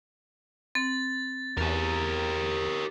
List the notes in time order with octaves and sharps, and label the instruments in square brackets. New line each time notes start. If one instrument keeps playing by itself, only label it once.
[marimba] C4 [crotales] A6
[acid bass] E2 [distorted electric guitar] G4 A#4